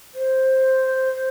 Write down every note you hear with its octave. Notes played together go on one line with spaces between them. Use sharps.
C5